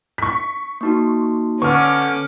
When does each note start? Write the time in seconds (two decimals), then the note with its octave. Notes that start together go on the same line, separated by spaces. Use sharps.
0.18 C#6 B6
0.81 A#3 D#4 F#4
1.62 D3 C#4 B4 C#6 D6 F6